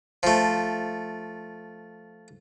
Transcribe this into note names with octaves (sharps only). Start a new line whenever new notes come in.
F3 A3